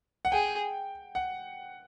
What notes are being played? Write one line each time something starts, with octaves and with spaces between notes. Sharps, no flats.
F#5
G#4 G5
F#5